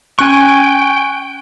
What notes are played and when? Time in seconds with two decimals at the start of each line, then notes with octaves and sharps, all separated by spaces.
0.19 C#4 G5 G#5 C#6 F#6